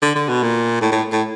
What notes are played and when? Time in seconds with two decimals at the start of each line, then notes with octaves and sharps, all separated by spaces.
0.02 D3
0.15 D3
0.28 B2
0.43 A#2
0.81 A2
0.92 A2
1.12 A2